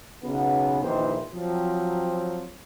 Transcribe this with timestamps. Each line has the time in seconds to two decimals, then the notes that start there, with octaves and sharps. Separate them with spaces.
0.23 B1 C#3 B3
0.82 A#1 D#3 E3 C5
1.34 F3 F#3 C4